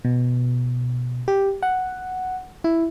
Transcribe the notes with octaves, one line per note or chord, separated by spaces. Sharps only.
B2
G4
F#5
E4